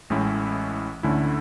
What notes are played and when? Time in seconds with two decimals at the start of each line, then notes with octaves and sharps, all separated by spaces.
0.10 A1 A2 G#3 C#4 E4
1.03 D2 D3 A3 C#4 E4